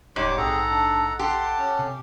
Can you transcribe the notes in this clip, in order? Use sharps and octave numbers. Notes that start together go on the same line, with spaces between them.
D1 G#2 G3 C#5 D6
A#1 C4 G#4 A4 F#5 A#5
D4
G4 A4 F#5 A5 C6
C#4
C3